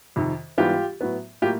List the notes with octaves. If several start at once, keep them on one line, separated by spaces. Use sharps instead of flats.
F2 C3 D#3
G#2 E3 G3 B3 F4 G4
A2 F#3 B3
A2 F#3 A#3 F4 G4